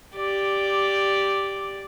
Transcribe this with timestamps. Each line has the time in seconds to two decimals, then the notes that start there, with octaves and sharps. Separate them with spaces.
0.16 G4 D5